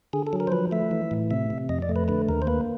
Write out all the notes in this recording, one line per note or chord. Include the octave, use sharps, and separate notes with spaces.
D3 G#4
A4
F#3
A#4
C5
F3 B4
A3 E5
E3
A2
C3 E5
C3
F2 D#5
D5
A3
B4
D3 B4
D#2 A#4
C5
A#3 B4